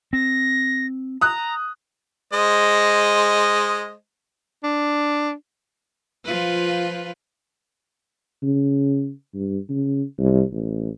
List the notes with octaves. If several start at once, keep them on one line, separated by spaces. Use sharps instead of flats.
C4 A#6
A#5 D#6 F#6
G#3 C5 D#5
D4
F3 F4 B4
C#3
G2
C#3
C2
A1